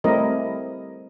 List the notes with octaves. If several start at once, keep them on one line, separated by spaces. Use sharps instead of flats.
G3 A3 C4 E4 A#4 D#5